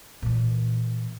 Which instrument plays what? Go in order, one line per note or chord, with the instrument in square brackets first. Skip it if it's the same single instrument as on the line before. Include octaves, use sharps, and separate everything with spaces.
[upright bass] A#2 E3